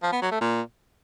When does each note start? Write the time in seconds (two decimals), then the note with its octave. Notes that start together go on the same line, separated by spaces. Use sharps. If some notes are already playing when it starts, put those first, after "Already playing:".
0.03 F3
0.12 B3
0.22 F#3
0.31 A3
0.41 A#2